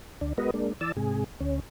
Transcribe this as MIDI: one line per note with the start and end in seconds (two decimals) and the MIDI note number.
0.21 0.33 38
0.21 0.33 62
0.38 0.51 56
0.38 0.51 59
0.38 0.51 66
0.38 0.51 70
0.38 0.51 71
0.38 0.51 75
0.54 0.73 56
0.54 0.73 58
0.54 0.73 62
0.81 0.92 52
0.81 0.92 74
0.81 0.92 81
0.81 0.92 88
0.97 1.24 44
0.97 1.24 48
0.97 1.24 68
1.41 1.60 38
1.41 1.60 61